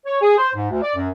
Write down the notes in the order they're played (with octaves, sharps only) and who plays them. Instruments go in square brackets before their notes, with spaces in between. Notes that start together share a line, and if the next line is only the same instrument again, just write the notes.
[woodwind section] C#5
G#4
C5
G#2
D2
D5
F#2